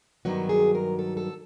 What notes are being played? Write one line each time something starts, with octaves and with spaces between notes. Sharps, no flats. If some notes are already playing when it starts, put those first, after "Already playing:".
G2 D#3 F#3 B3 F#4
G#4
A#4
A4
A4